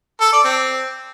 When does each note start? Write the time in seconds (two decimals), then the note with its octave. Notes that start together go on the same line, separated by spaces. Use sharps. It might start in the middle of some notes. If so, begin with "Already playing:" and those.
0.21 A4
0.32 D5
0.44 C4